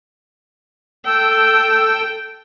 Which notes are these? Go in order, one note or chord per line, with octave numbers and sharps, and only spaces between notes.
A4 G5 E6